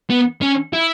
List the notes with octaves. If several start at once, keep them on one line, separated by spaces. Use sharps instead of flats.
B3
C#4
E4